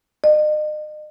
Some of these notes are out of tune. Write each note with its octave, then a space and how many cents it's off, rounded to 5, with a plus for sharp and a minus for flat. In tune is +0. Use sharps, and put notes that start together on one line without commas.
D#5 -40